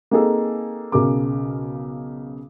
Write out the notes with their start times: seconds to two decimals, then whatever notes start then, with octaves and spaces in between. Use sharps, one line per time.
0.11 A#3 C4 D#4 G#4 A4
0.92 B1 C#3 A#4 D6